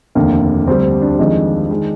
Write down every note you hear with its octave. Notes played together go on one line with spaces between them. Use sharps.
F1 D#2 D3 A#3
D2 D3 G3 C4
D4
F2 D#3 G#3
D#3 G#3